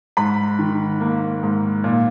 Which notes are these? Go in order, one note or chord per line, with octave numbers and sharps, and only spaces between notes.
G#2 B5
D#3
A#3
G#2
A#2